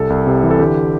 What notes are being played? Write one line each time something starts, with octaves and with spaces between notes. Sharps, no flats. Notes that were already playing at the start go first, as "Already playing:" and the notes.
Already playing: C2 A4
C2
C3
E3
A4
D3 G4